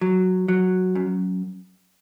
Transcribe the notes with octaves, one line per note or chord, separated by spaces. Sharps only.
F#3
F#3
F#2